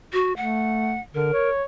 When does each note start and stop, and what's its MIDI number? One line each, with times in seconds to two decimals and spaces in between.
0.13 0.33 66
0.36 0.96 57
0.36 1.00 78
1.15 1.28 50
1.15 1.49 70
1.33 1.64 73